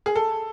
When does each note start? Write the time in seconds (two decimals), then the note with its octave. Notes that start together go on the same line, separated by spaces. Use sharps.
0.06 G#4
0.15 A4